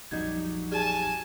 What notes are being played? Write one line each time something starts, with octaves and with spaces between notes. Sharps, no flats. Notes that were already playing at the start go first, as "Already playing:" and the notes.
A#1 F2 F#3 G3 D#4 G6 G#6
G4 G#4 D5 G#5 A5